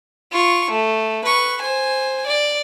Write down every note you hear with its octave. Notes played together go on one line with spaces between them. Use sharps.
F4 C#6
A3
B4 C#6
C5 G#5
D5